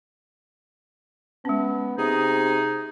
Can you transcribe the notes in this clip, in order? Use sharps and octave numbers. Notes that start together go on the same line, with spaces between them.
G#3 B3 C#4
C3 D#4 G#4